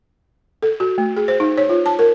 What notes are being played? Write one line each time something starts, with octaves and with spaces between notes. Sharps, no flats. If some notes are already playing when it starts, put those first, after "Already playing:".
A4
F#4
A3
G#4
C5
D#4
C#5
F4
A5
A#4